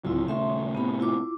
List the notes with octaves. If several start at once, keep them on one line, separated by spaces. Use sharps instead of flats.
D1 C#2 F#3 C4 E4 F4
D#1 C#3 A3 E5 C6 C#6
A2 C3 B3 C#4 B5
E4 F4 D6